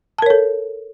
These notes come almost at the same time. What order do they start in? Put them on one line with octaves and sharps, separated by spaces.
A5 A#4 C#5 A4